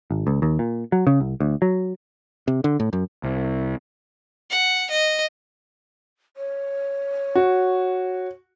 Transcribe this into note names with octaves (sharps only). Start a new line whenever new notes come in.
G#1
C#2
D#2
A#2
F#3
C#3
C2
D2
F#3
C3
D3
A2
F#2
C2
F#5
D#5
C#5
F#4